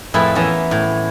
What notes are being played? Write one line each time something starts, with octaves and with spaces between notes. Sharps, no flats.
F2 A2 E4 G#4 A4 B4
E3 B3 C#4 E4 A5 A#5
A2